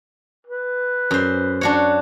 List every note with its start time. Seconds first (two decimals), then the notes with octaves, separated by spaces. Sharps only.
0.47 B4
1.11 F#2 C5
1.61 D4 F#4 C#5